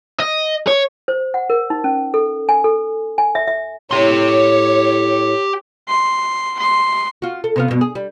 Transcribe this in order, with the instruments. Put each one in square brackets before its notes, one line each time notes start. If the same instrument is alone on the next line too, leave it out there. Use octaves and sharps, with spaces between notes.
[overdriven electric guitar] D#5
C#5
[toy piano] C5
F#5
A#4
D#4
C#4
A4
G#5
A4
G#5
E5
E5
[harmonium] A2 [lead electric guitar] G4 C6 [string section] C#5
[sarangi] C6
C6
[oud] F4 F#4
A4
C3 B3 F5
G2 B2
G#4
G3